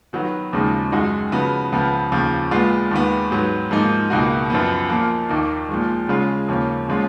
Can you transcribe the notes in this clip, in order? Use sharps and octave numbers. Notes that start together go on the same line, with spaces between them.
D#3 F#3 B3 F#4
D#2 C#3 F3 G#3 D#4
F#2 D#3 G#3 D#4 F#4
C#3 F3 B3 F#4
C#2 C#3 F3 B3
D#2 C#3 F3
A#2 G#3 B3 F4
D#2 D#3 G#3 B3
G#2 F#3 B3
G#2 F3 A#3 D#4
C#2 B2 A#3 D#4 F#4
F#2 F3 B3
A#2 F3 A#3
D#2 D#3 A#3 D#4
A#2 F3 G#3
C#3 G#3 C#4 F4
D#2 C#3 F3 A#3 C#4
A#2 F3 G#3 C#4 F4